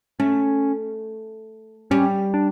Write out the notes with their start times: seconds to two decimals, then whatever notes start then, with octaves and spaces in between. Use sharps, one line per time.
0.20 A3 C#4
1.91 G3 C#4
2.34 D4